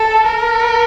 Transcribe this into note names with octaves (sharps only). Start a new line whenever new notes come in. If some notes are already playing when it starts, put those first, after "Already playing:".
Already playing: A4
A#4